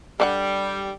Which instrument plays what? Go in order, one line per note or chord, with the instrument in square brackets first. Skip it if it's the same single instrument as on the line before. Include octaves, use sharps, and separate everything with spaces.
[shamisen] D3 F#4 F#5 [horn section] G3